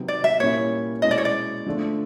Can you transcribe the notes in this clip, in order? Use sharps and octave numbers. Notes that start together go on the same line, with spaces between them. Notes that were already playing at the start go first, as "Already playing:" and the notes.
Already playing: C3 D#3 F#3 B3
D5
E5
A#2 G3 A#3 C#4 E4 C#5
B2 G#3 C#4 E4 D#5
D5
C#5
D5
D3 F3 A3 D4